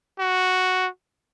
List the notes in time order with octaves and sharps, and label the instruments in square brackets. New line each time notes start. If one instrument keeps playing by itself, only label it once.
[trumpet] F#4